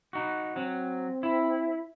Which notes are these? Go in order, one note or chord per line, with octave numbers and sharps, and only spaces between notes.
D#4 F#4
F#3 C4
E4